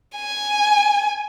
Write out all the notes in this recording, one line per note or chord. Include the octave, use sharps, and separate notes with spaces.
G#5